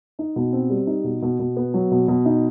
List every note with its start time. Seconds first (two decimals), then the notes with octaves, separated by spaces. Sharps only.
0.19 D#4
0.36 B2
0.53 C4
0.70 G3
0.87 D#4
1.04 B2
1.22 B2
1.40 B2
1.57 B3
1.74 F#3
1.91 B2
2.08 B2
2.25 D#4